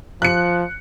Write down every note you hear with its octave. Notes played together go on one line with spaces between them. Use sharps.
F3 F#6 C#7